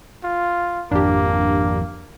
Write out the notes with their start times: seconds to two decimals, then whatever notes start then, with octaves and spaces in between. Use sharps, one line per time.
0.24 F4
0.91 G#1 F2 F3 A#3 D4 G4